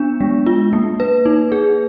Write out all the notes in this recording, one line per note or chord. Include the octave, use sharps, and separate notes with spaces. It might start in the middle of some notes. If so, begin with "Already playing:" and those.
Already playing: B3 D4
G#3
F4
A#3
B4
D#4
G#4